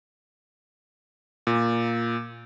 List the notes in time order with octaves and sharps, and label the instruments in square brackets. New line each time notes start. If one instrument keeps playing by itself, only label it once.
[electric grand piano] A#2